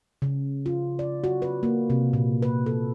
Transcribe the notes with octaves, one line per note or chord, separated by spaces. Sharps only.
C#3
F4
D5
F#4
B4
A#3
C3
A#2
B4
A4